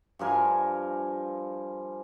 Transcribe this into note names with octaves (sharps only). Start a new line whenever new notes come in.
G2 F3 A#4 G#5